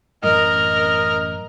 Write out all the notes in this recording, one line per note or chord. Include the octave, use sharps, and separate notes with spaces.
A1 F#2 A2 A#4 D#5